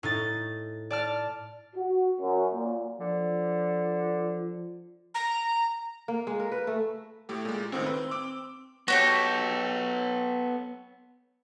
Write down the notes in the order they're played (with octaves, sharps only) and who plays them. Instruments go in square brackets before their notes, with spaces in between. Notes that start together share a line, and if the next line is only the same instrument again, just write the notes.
[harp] A2 D#4 A6
D5 A5 F6
[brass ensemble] F#4
F#2
A#2
[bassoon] D3 [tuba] F3
[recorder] A#5
[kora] A#3
G#3
A#4
B4
A3
[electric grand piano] A2 A3 G4
A#2 G#3
[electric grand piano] C#2 A2 D#3 [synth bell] C4
[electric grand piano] B4
D6 E6 D7
[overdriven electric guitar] B3 C#5 [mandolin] F#4 G4 A4